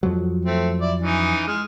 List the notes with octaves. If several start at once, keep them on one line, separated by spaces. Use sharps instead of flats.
F2 F3 F#3
A3 C4
E4 D5
E3 C#4 D#4
G#3 F6